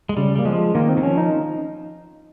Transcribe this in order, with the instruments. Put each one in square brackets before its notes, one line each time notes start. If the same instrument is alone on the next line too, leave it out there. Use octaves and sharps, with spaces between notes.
[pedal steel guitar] G#3
[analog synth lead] C#3 [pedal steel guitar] G3
[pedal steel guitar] G3 [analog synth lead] A#3
[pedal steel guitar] F3 [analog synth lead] G#3
[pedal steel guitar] D#3 [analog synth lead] A#3
[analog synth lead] C4
[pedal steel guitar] D#3
[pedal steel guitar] F3 [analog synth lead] C#4
[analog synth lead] D#4